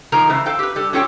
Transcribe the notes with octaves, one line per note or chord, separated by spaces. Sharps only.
D#3 F3 G#3 A#3 A#4 A#5
C#3 E3 C5
A4 C5 F5 G5
G4 B4
G3 A4
C#4 F4 G4 A4 C#5 G5